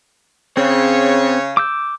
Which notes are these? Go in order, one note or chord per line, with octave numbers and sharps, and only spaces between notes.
C#3 C4 C#5
D6 E6 G6